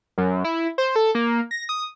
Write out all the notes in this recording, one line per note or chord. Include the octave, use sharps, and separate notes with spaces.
F#2
E4
C5
A4
A#3
A#6
D#6